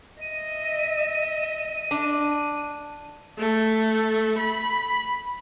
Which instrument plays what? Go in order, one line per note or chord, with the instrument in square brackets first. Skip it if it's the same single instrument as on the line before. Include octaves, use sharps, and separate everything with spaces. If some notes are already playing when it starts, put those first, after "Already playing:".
[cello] D#5 E5 [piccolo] D#7
[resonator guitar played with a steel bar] D4
[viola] A3
B5